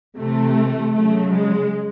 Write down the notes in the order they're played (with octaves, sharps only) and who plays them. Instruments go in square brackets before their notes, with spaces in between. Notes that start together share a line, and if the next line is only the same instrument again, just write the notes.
[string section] C3 E3 A3
C#3 F#3 A3
G#3